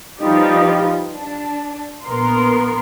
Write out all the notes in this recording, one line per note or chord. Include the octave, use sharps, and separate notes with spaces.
F3 G3 D#4 F4 G4 B4
D4
A#1 B3 A#4 C6